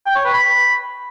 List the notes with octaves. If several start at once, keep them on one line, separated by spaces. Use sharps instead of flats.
G5
C#5
B4
B5